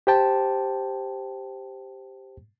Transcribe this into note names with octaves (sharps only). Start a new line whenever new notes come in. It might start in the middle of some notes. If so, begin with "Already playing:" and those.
G4 C5 G5 A5